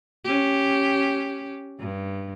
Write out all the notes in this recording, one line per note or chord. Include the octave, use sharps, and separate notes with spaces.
C#4 G4
G2